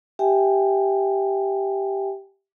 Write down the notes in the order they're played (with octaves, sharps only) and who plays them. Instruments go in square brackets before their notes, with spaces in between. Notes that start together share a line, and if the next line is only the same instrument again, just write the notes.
[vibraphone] G4 E5 G5 G#5